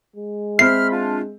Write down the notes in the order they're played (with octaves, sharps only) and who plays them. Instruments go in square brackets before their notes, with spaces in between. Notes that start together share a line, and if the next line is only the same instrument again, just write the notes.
[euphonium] G#3
[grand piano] C4 E5 [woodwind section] B5 C6 F6 [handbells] C7
[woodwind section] D4 F4